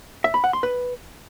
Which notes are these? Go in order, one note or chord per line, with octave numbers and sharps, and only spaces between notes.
E5
B5
F#5
C6
B4